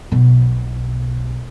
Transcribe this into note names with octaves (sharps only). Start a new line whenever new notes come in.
B1 B2